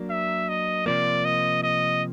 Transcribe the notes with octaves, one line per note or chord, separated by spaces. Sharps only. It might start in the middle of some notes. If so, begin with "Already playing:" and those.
Already playing: F#3 A#3 D4
E5
D#5
C3 F3 A#3 D5
D#5
D#5